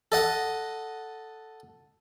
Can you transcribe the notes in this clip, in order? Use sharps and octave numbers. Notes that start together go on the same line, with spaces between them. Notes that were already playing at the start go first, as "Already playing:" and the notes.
A4 D#5 F#5